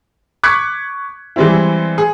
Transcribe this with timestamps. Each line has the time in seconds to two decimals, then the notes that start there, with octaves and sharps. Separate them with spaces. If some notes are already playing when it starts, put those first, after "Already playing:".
0.43 C#6 D6 F#6 G#6 B6 C#7
1.36 E3 G3 G#3 C4 E4
1.98 G#4